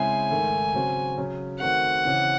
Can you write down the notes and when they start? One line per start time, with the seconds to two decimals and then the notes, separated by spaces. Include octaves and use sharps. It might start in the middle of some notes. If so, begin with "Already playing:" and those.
Already playing: C#3 G#3 C4 E4 C5 G#5
0.31 G#2 D#3 A3
0.74 C#3 F#3 C4 F#4
1.18 C#3 F#3 C#4
1.60 D#3 A3 C4 F#4 F#5
2.04 C#3 E3 C4